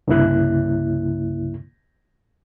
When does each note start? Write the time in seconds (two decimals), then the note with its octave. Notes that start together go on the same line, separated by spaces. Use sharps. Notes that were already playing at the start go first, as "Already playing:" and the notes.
0.07 C2 G2 C#3 A#3 E4 F#6